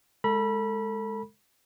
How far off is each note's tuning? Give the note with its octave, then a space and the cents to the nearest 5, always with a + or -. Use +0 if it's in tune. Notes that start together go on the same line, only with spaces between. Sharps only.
G#3 +10 A4 +30 B5 -25